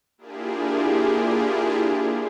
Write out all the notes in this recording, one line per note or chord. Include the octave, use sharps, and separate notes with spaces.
A#3 D4 E4 F4 G4 G#4